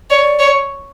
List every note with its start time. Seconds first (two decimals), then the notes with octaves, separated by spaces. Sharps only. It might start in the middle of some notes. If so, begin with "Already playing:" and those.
0.10 C#5 D5
0.39 C#5